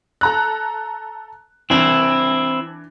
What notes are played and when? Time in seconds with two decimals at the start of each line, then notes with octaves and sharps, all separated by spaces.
0.21 A4 A#5 F#6
1.70 E3 C4 D4 E4 F7